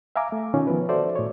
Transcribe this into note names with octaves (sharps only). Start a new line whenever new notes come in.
E5 F5 G#5 A#5 D6
A3
B2 D#3 C#4 D#4 F4
D#3 F3 B3 B4
F#4 A4 C5 D5 E5
A2 C#5